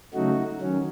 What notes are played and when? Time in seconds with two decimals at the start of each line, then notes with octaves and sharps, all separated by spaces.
0.14 C#3 F#3 A3 D#4 F#4
0.61 D#3 F#3 C#4